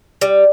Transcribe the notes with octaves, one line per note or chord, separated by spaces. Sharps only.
G3